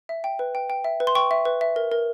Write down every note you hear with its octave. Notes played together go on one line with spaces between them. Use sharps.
E5
G5
B4
G5
G5
E5
B4
C6
G5 C#6
E5
B4
E5
A#4
A#4